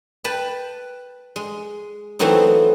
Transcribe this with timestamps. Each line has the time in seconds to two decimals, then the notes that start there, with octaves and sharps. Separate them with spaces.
0.24 B4 G5 A5 B5
1.36 G#3
2.19 E3 F#3 A3 B3 C4 D#4